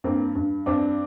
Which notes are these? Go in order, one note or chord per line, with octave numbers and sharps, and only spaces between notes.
G2 A#3 C4
G2
G2 C4 D4